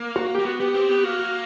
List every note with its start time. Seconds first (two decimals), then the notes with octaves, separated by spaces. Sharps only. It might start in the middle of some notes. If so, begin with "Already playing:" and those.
Already playing: A#3
0.16 F#4
0.35 G4
0.39 A#3
0.45 B3 F#4
0.60 B3 G4
0.74 C4 G4
0.89 B3 G4
1.04 A#3 F#4
1.19 F#4